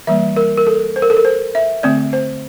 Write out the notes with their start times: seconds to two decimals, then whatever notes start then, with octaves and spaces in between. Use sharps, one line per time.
0.07 E3 G3 A#3 E5
0.36 A#4
0.57 A#4
0.67 A4
0.96 C5
1.02 A#4
1.10 A4
1.17 A#4
1.25 C5
1.55 E5
1.83 D3 A3 C4 D5
2.13 C5